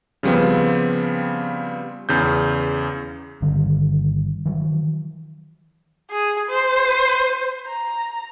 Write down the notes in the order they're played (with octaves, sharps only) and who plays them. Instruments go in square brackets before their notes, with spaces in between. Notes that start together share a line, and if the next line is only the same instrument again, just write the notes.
[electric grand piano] C#3 F3 G3 B3 C4
E2 C#3 G6
[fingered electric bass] G1 D3 D#3 G3
D#3 E3 F#3
[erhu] G#4
C5
A#5